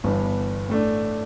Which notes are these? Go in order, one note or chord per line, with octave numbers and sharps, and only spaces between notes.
G1 G2 E3 B3
A2 A3 D4